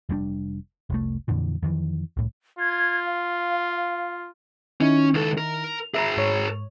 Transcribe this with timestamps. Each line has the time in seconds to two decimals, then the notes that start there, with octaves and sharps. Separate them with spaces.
0.09 F1 G3 C4 D4
0.90 F1 C2 A3
1.28 F2 A#2 D3 E3
1.63 F2 D#3 E3
2.17 C2 A2
2.59 F4 G#6
3.06 F5
4.81 D#3 C#4 D#4 E4
5.14 C#2 A4
5.38 A#4
5.94 G#4 A#4 E5 A#5
6.17 G#2 C#5